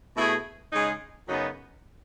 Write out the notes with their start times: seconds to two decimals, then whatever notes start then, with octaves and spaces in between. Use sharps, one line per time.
0.15 B2 A3 E4 G#4
0.72 C#3 G#3 D#4 G#4
1.28 F#2 C#3 F#3 B3 D#4